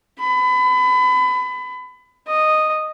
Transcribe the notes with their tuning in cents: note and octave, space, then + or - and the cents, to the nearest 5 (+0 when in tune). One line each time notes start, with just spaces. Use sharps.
B5 +30
D#5 -5